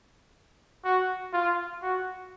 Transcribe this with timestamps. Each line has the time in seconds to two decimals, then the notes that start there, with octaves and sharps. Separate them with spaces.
0.85 F#4
1.33 F4
1.82 F#4